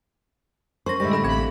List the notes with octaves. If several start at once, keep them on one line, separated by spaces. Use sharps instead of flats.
C#4 A#4 C5 C#6 A#6
A2 D3 G3 G#3 E4 G4 A#6
A4 B5 A#6
A1 C4 B5 G#6